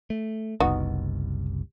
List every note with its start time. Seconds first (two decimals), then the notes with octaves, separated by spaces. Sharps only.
0.10 A3
0.60 F#1 C2 B3 D#4 F#4